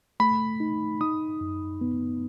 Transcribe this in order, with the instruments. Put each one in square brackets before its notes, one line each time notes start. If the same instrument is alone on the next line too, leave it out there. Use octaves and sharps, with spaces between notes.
[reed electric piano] A3 [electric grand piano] B5
[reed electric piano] D#4
[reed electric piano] D#4 [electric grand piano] D#6
[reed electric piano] F#2
B3